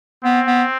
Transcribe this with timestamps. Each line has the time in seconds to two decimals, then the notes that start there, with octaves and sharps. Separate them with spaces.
0.24 B3 C4
0.47 B3